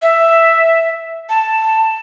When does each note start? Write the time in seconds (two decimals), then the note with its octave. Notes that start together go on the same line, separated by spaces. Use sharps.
0.02 E5
1.29 A5